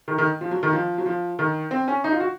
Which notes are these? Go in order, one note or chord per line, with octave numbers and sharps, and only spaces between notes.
D#3
D#3
F3
F#3
D#3
F3
F#3
F3
D#3
C4
C#4
D#4
F4
F#4